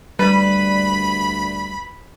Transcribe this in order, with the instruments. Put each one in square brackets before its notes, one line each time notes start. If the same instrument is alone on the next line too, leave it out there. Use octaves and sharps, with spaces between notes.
[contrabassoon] D2 [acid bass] G3 [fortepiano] B4 [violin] B5